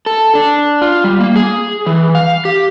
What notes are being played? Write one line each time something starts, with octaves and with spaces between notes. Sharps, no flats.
A4
D4
F4
G3
A#3
G#4
E3
F5
G4